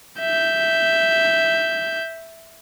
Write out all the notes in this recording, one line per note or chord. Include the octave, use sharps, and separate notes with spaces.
E5 G6